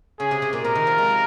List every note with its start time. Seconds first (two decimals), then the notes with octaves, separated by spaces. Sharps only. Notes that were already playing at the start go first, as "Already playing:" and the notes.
0.20 C#3 G#4
0.31 C3
0.42 C3
0.53 A#2
0.64 C3 A#4
0.75 D#3
0.87 F3
0.98 G#3